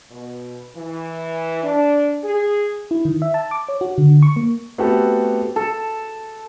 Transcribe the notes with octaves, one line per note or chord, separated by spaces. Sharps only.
B2
E3
D4
G#4
E4
D#3
E5
A5
D6
C#5
F#4
D3
C#6
A#3
A3 B3 C4 F#4 G4 A4
A4